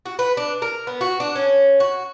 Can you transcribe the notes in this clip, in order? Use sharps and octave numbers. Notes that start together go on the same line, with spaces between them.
F#4
B4
D4
A#4
B3
F#4
D4
C#4
F#4